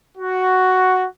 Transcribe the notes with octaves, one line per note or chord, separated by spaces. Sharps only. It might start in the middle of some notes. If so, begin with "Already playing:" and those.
F#4